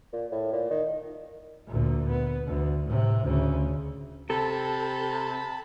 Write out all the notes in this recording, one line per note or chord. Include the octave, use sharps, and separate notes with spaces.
A#2
A2
A#2
D#3
D2 A#2
B3
D2
A2 C3
D2 C#3
C3 A4 A5 B5